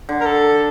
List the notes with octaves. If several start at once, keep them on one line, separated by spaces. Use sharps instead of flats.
D3
A#4
A4